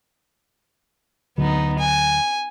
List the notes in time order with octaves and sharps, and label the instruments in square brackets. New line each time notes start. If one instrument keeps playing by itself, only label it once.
[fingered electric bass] D2 D3 F#3 [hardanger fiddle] B3 D#4
[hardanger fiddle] G#5